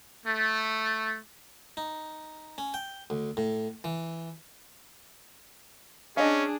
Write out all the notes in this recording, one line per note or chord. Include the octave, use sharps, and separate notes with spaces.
A3
D#4
C#4
G5
D2
A2
E3
C#4 D4 G#4 D#5 F5